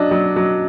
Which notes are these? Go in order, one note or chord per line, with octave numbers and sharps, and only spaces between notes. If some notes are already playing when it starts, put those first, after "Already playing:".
Already playing: F#3 D4 D#5
F#3
F#3